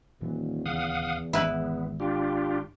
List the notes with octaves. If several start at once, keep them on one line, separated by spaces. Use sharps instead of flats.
D#1 A#2 E3 F#3
D#1 E2 C#3 F5 F#5 D#6
G#1 B3 E4 B4
D4 F4 G4